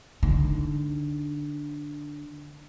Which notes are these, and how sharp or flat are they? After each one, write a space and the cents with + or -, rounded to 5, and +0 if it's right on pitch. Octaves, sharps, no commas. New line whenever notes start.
D3 +0 D#4 +0